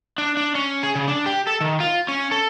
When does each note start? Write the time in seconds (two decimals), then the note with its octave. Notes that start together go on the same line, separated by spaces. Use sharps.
0.18 D4
0.37 D4
0.55 C#4
0.83 G#4
0.95 C#3
1.08 D4
1.26 G4
1.47 A4
1.61 D#3
1.80 F4
2.08 C#4
2.31 A4